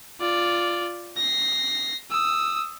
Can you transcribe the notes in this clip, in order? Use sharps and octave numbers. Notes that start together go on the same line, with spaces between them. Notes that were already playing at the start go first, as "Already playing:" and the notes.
F4 D5
A#6 C7
D#6 E6